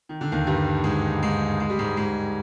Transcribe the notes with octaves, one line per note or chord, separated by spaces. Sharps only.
D#3
D3
D#2 D#3
G2 G3
G#2 G#3
G#2 G#3
G#3
G3
G#2 G#3
G#2 G#3